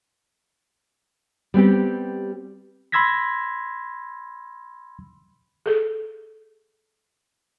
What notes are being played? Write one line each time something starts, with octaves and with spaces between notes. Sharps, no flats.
G3 B3 C4 G4
B5 C6 E6 G#6 A#6 B6
G#4 A4